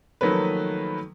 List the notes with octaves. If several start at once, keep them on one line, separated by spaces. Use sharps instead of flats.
D#3 F3 F#3 A3 A#3 B4